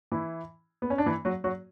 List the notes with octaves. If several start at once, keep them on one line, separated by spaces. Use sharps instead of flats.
E3 E4
B3
C#4
D4
E3 E4
F#3 F#4
F#3 F#4